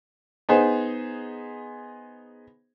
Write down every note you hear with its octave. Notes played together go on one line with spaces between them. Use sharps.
B3 D#4 G#4 C5